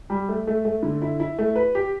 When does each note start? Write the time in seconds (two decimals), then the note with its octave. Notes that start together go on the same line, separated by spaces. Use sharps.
0.10 G3
0.29 A3
0.47 A3
0.65 A3
0.83 D3
1.02 E4
1.20 E4
1.39 A3
1.56 B4
1.75 G4